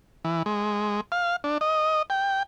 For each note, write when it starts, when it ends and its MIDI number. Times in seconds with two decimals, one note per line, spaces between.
0.25 0.43 52
0.46 1.01 56
1.12 1.36 77
1.44 1.58 62
1.61 2.02 75
2.10 2.43 79